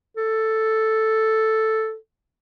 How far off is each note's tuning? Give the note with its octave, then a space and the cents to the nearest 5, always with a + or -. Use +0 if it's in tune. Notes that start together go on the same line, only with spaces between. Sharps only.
A4 +0